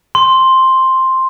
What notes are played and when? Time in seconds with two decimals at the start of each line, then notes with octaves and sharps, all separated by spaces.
0.15 C6